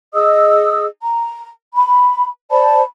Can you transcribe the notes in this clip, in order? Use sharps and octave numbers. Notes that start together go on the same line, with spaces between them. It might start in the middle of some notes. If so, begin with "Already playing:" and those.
G#4 D#5 D#6 E6
A#5
B5
C5 D5 A5 B5